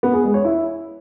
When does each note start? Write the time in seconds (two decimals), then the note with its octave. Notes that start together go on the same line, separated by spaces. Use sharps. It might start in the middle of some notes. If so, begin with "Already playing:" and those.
0.03 B3
0.13 G#4
0.24 G#3
0.34 C#5
0.44 E4